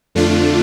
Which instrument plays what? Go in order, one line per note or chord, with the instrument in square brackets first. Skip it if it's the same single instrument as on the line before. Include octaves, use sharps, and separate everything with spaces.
[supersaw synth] F2 D3 A3 D4 F4